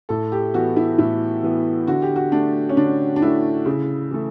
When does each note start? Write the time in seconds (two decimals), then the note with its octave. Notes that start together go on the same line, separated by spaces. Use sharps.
0.09 A2 A4
0.32 G4
0.54 E3 B3 F#4
0.76 E4
0.98 A2 E4
1.43 E3 B3
1.87 D3 F#4
2.02 G4
2.16 F#4
2.32 A3 D4
2.69 C#4
2.77 D3 D4
3.16 D4
3.22 A3 E4
3.66 C#3
4.11 E3 A3